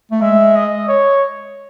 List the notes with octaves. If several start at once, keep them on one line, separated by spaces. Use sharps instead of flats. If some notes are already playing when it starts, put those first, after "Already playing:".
A3
G#3 E5
D#5
C#5